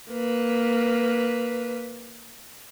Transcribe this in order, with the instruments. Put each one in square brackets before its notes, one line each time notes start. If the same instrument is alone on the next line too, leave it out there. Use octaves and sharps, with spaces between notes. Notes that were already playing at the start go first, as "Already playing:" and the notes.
[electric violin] A#3 B4